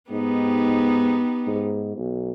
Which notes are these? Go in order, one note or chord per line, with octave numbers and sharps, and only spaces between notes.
G#2 B3 D#4 G4
G#2
B1